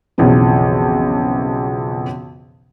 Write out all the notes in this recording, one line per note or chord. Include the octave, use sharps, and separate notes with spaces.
B1 F2 C#3 E3 F3